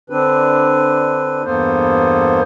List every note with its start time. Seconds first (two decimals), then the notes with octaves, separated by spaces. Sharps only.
0.10 D3 C4 D4 B4
1.44 E2 G2 A#3 B3 A4 C5